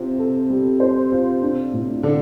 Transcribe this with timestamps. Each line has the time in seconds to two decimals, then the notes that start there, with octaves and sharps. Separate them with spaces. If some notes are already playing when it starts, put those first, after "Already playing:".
Already playing: C3 C4 F4 C5
0.19 A4
0.50 G3
0.80 C5
1.12 F4
1.42 D4
1.73 A2
2.03 D3 D4 F4